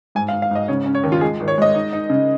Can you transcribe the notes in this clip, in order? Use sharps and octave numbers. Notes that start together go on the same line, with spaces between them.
G#2 G#5
F5
G#2
F5
G#2 D#5
C#3 C#5
C#4
C#5
D#2
F4
G#3 G#4
G#1
C#5
G#3 D#5
D#4
D#4
C#3